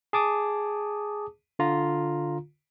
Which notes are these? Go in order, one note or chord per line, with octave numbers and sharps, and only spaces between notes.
G#4 A5 D6 D#6
D3 F4 A#5